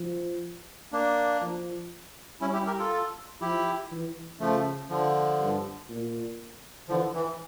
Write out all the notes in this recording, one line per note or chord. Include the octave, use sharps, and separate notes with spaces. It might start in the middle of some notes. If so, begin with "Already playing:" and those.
Already playing: F3
A#3 D4
F3
G3 C#4 E4
E4 G4
G4 A#4
F4 A4
F3 E4 G4
E3
C#3 F3 A3
D3 F3
G2
A#2
D3 E3 F3
E3